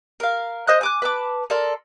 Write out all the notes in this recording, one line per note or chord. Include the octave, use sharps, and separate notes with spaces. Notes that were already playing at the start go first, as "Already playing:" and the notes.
A#4 F5
C5 D#5 D#6 F#6
G#5 D6 F#6
B4 A5 D6
A4 A#4 D5 C6